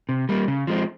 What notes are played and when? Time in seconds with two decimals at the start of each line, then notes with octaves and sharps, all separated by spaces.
0.09 C3
0.29 G3 A#3
0.48 C#3
0.67 F3 G#3 C4